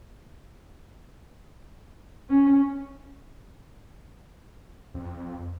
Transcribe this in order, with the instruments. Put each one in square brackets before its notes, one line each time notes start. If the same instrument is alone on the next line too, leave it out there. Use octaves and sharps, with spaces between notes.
[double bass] C#4
[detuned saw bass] F2